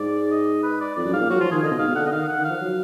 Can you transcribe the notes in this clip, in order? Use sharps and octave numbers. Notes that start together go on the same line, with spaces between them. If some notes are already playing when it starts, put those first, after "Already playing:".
Already playing: G#2 D5
D#5
B4
D5
F2 D5
F#2
G#2 F5
A#2
F#3 F#4
F3 F4
D#3 G#4
D3 D#5
B2
G#2 F5
B2
D3 F#5
D#5
D#3 F5
D3 F#5
D#3
F5
F3
F#3